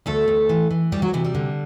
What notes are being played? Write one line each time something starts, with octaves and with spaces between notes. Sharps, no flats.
D2 A3 A4
D2
E3
E3
D2 G3 G4
F#3 F#4
C3 E3 E4
G3
D3